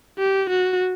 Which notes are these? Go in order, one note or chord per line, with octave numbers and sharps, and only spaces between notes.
G4
F#4